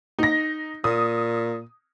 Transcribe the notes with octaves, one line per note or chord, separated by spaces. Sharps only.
D#4 A#6
A#2 D#6